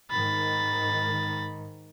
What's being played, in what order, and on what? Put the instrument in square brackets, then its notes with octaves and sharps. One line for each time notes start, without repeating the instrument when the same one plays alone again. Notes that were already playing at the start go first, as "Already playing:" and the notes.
[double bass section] G#2 D#3 [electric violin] B5 A6